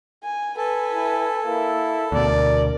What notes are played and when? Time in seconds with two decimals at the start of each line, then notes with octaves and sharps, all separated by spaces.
0.24 G#5
0.57 A4 B4 G#5
0.91 E4
1.46 A#3 E4
2.12 D2 B2 A#4 D5